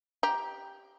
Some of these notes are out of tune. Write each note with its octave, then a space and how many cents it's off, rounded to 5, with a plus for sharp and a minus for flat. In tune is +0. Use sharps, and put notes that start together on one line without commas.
G4 +0 A#5 +15